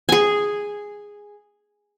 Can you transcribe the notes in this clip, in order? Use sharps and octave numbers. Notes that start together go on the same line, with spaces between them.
G#4 G#5